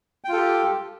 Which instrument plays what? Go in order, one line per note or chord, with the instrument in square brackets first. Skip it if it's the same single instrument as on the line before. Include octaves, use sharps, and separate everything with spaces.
[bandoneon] G5
F4
A4
G4